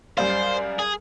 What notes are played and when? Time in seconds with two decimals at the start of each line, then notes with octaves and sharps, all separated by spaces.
0.18 F#2 G3 C5 D5 F5
0.79 G#4